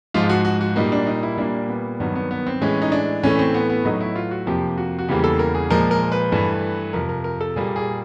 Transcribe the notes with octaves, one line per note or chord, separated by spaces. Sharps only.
G#2 F3 G#3 F4
F#4
F#4
F#4
A#2 G3 A#3 D#4
D4
D#4
E4
A#2 G3 A#3 D4
B3
G2 D#3 F#3 B3
B3
B3
C4
A2 E3 G#3 C#4
D#4
D4
A2 E3 A3 C#4
C4
B3
B3
A2 F#3 A3 D#4
E4
F4
F#4
F2 C3 F3 A#3 G4
F#4
F#4
E2 C#3 E3 G3 A#3 G4
A4
A#4
G#4
A#2 F3 G#3 A#4
A#4
B4
G2 E3 A3
F2 C3 F3 A#4
A#4
A#4
A4
A#2 G3 A#3 G#4
G#4